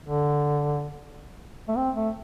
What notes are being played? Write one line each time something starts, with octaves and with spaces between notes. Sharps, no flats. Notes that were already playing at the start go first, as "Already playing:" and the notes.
D3
A3
C4
A3